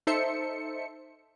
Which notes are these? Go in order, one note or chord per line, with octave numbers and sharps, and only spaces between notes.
D#4 A4 C5 E5 C#7